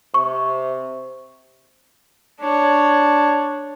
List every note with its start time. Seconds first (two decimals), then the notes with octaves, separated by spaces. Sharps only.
0.14 C3 C#6
2.41 D4 C#5